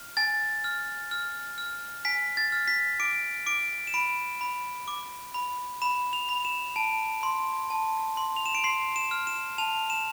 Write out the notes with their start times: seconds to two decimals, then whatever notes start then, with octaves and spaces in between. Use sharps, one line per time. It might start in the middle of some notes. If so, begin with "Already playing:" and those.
Already playing: F6
0.17 G#5 A6
0.64 F6
1.11 F6
1.58 F6
2.05 G#5 B6
2.37 A6
2.52 F6
2.68 B6
3.00 D6 D7
3.46 D6 D7
3.87 E7
3.94 B5 D7
4.41 B5
4.88 D6
5.34 B5
5.82 B5 E7
6.13 F7
6.29 B5
6.45 E7
6.76 A5 D7
7.23 C6
7.70 A5
8.17 C6
8.36 F7
8.46 E7
8.55 D7
8.64 C6 C7
8.96 E7
9.11 F6
9.27 E7
9.58 A5 F7
9.90 E7